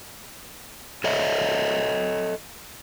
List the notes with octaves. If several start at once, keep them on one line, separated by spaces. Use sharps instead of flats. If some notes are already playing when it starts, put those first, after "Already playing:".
A4 C#5 D#5 E5